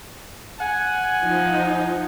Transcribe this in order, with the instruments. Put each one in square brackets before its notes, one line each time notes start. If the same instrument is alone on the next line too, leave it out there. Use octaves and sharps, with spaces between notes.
[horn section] F#5 G#5
[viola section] F3 D#4